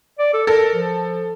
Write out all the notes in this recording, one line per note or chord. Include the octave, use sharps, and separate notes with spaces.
D5
A4
A4 A#4
F3